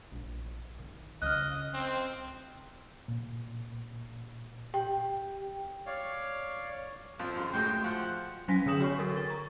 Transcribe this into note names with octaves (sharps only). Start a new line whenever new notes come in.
A#1
D#3
C#2 F4 D#5 F6 F#6
C4
A#2
G4 G5
C#5 D5 F5
F2 F3
F#2 C#3
A2 G#3 F#4 G5
F3 F#5
F#3 C#4 G#5 A#6 B6
D3 B3 G#4 D#6 E7 F#7
F#4 C#5 C#6
A4 A#4
A#4 C#6 A6
A#5